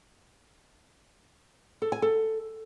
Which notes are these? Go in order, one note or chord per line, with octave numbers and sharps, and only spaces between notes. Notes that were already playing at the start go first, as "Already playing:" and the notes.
A4
G#5
A4